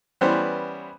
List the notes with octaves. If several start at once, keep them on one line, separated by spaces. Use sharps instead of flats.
E3 G3 B3 C#4 C5